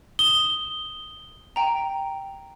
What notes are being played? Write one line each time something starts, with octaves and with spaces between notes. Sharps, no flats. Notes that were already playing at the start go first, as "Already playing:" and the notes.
D#6 E7 G7
G5 A#5